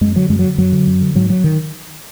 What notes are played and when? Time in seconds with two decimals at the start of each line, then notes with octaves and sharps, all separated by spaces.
0.01 F#2 G#3
0.15 D3 F#3
0.29 F#2 G#3
0.39 F#3
0.44 D3
0.58 F#2 F#3
0.72 D3
0.87 F#2
1.01 D3
1.15 G#2 F#3
1.30 F#3
1.44 D#3